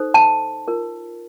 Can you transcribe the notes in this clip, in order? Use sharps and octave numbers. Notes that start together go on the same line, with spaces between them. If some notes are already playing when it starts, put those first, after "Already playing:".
Already playing: D#4 A4 C5
A5
F4 A#4